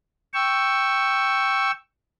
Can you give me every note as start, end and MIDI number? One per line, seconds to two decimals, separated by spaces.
0.34 1.71 79
0.34 1.71 85
0.34 1.71 88